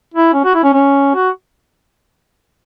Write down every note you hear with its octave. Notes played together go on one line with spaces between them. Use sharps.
E4
C#4
F#4
E4
C#4
C#4
F#4